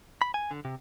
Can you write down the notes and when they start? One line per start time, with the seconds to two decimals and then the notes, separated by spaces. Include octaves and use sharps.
0.22 B5
0.34 G#5
0.51 D3
0.65 C3